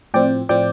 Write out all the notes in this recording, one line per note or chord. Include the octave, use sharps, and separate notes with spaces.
A2 F3 C4 D5 G5
A2 F3 C4 D5 G5